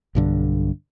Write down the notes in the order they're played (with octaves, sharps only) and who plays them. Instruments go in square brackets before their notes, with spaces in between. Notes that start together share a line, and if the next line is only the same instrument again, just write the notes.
[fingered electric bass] B1 G2 D3